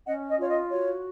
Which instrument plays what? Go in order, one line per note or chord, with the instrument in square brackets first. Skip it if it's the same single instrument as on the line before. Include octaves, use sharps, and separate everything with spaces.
[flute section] C#4 D#5 F#5
D#5
F4 C#5
D#5
F#4 C#5